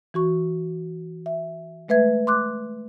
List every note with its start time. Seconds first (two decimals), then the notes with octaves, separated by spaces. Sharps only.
0.14 E3 F#4 C#6
1.26 E5
1.89 G#3 A3 B4 E5 G#6
2.27 C6 D6 F#6